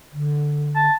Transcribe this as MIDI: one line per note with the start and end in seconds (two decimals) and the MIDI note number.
0.13 0.88 50
0.75 0.94 81